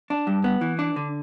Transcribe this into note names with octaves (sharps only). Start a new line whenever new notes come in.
D4
G2
B3
E3
D4
D3